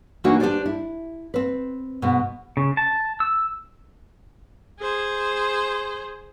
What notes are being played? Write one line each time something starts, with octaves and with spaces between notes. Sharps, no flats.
E3 A3 A#3 D4 D#4 F#4
D4 G4 B4 C5 D5
E4
C4 B4
G#2 B2
C#3
A5
E6
G#4 C5